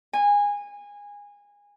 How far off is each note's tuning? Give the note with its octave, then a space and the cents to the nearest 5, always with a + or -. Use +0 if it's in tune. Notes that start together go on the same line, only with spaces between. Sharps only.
G#5 -20